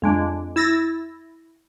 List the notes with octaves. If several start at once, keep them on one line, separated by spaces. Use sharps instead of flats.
F2 G#3 D4
E4 E6 A6 A#6